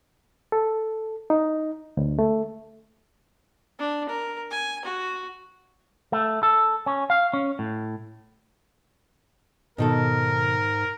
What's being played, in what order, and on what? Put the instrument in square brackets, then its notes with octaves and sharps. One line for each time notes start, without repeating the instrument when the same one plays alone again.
[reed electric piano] A4
D#4
D2
A3
[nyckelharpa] D4
A#4
G#5
F#4
[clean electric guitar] A3
A4
C#4
F5
C#4
A2
[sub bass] G#2 [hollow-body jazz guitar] B2 D#3 A4 [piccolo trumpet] A#4